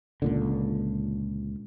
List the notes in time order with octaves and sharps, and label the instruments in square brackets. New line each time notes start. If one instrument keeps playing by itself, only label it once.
[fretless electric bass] C#2 A#2 D3